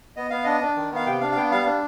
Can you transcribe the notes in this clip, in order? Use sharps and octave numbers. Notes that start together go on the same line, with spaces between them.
B3 D#5
B3 F5
D4 D#5
D4
D#3
B3 F5
C3 G5
D4 F5
F5
B3 G5
G3 F5
D4